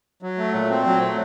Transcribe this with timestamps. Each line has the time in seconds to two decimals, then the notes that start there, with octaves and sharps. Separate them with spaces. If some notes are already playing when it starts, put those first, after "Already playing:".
0.22 F#3
0.38 A3
0.54 A#2
0.70 C4
0.87 F#3
1.02 A3